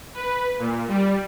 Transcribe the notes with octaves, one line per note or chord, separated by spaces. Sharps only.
B4
A#2
G3